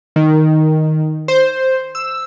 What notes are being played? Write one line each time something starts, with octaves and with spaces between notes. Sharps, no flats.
D#3
C5
E6